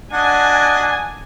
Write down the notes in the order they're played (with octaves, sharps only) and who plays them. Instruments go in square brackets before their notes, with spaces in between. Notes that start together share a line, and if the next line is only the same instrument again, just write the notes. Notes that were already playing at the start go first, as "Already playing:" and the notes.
[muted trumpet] D4 [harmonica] F#4 D#5 F#5 [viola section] G#5